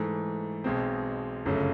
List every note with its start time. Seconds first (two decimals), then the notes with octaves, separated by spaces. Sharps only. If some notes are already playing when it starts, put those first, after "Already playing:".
Already playing: G#2 E3 A3
0.64 B1 B2 G#3 C4
1.46 G1 F#2 C#3 F#3 A3